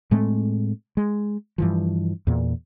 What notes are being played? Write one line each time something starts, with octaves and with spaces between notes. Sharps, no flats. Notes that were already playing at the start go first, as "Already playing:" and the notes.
A2 G#3 A3 C4
G#3
G2 E3 F3
E2 A#2